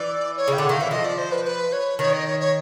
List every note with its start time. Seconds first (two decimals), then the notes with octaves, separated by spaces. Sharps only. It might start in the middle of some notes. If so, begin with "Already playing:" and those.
Already playing: E3 D5
0.37 C#5
0.48 C#3
0.53 G5
0.58 D3 F#5
0.69 D#3 F5
0.81 E3 E5
0.91 F3 D#5
1.04 D5
1.18 C5
1.32 B4
1.45 B4
1.73 C#5
1.99 D#3 C#5
2.13 D#5
2.27 C#5
2.40 C#5